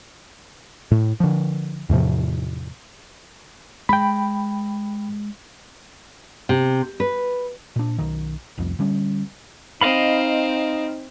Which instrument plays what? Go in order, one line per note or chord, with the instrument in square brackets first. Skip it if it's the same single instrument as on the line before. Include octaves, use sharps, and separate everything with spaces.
[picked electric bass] A2
D3 F3
E2 A2 C3 F3
[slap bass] G#3 [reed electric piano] G5 B5
[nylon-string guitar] C3
B4
[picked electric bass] A#2 D4
B1 D#3
F1 C2 F2
D3 G3 C#4
[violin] C4 [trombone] D#4 [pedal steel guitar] D#5 F5 B5